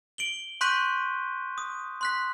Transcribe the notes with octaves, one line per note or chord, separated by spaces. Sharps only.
D7 F#7 G7
C6 C#6 F#6 G6 B6 D#7
D#6
C6 F#6 B6